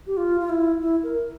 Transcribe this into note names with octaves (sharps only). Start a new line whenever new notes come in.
G4
F4
F4
E4
E4
A#4